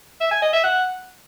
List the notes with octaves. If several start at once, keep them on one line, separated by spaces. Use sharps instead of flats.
E5
G#5
D#5
E5
F#5